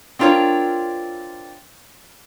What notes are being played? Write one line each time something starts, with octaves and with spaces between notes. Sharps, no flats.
C4 D4 F4 A#4 C#5